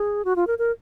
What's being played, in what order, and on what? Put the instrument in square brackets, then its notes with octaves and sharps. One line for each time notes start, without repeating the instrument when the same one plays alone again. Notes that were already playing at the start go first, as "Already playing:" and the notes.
Already playing: [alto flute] G#4
F#4
F4
A#4
A#4